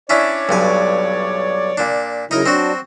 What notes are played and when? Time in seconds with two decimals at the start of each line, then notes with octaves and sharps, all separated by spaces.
0.10 C#4 D4 E4 C#5 D5
0.49 B1 G2 G#5
1.77 A#2 D4
2.31 C#3 F#3 D#4 E4 A#4
2.46 F#3 C4 D4 F#4